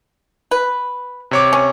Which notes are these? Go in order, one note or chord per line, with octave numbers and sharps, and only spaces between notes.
B4
C3 C#5 D6
C#4